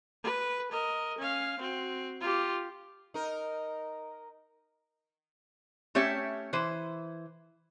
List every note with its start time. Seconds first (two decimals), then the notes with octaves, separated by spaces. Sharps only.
0.24 B4
0.72 A#4 D#5
1.18 C#4 F5
1.59 C4 F#4
2.21 F4 G4
3.14 D#4 A#4
5.95 A3 C#4 G4 C#5 E5
6.53 E3 C5